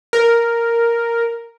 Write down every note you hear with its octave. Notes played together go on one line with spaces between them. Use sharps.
A#4